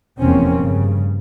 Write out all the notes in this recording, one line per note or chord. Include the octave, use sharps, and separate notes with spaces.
F1 E2 C3 A#3 C4 C#4
G2 C#3